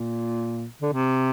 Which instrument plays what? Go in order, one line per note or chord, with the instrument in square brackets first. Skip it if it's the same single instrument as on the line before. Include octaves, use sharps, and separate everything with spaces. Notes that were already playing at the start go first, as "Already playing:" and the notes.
Already playing: [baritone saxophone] A#2
D3
C3